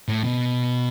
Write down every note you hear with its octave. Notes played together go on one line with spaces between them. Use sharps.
A2
B2